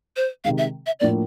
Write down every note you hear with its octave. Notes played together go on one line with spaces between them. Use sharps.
C5
C3 D#3 G#3 F5
E5
E5
A2 F3 A#3 D4 D5